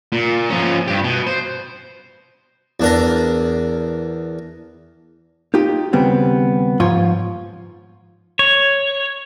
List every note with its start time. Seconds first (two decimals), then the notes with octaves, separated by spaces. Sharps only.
0.12 A#2
0.49 F3 C#4
0.88 G2 G4
1.04 B2
1.27 C5
2.80 E2 D4 A#4
5.54 D#4 F4 G4
5.93 D#2 C#3 G3 B3 C4
6.80 G#2 F3 F4 C#5 C6
8.39 C#5